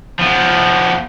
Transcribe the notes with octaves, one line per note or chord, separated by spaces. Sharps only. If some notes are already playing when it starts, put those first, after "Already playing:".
F3 B3